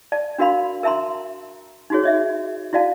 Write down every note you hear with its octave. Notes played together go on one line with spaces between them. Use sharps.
D5 A5
D4 F#4 A#4 F5 B5 C6
A#4 E5 A5 A#5 C6
D#4 F4 F#4 G#4 C#5
C#5 D#5 E5
E4 F#4 D5 F5 A5